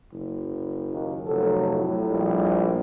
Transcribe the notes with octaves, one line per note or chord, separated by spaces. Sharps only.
F#1
D#2
F1 F#3 A4
A2
A#1 G3